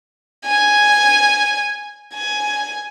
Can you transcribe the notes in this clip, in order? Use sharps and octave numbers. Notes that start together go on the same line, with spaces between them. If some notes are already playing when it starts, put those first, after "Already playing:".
G#5
G#5